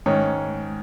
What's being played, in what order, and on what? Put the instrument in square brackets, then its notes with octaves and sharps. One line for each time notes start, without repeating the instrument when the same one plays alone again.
[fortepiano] G#2 D#3 C#4